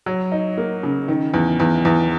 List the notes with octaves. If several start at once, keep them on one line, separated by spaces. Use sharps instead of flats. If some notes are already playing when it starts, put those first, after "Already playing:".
F#3
D#4
A#3
C#3
D#3
E2
E2
E2